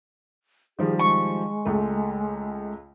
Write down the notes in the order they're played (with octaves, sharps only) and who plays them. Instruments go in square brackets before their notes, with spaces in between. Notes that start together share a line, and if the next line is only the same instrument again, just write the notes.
[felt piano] D#3 F3 G3 [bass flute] G#4
[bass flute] G#3 [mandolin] C#6
[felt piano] C#2 A3